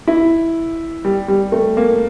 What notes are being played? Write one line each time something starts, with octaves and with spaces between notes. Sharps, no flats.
E4
G3
G3
A3
A#3